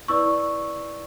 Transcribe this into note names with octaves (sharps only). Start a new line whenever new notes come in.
E4 B4 D5 C#6 E6